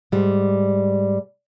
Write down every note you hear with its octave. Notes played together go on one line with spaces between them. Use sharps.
G#2 G3